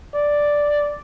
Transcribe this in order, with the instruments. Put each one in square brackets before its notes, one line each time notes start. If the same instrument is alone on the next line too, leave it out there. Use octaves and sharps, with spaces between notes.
[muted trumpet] D5